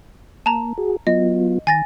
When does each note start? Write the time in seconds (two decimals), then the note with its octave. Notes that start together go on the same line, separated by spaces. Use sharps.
0.46 A#3 A5 A#5
0.78 F#4 G#4
1.07 F#3 B3 F4 D#5
1.67 D#3 G#5 A6 A#6